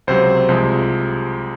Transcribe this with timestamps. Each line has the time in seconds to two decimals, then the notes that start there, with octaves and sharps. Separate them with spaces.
0.07 C#2 C3 F#3 C5
0.48 C2 C3 F3 G#3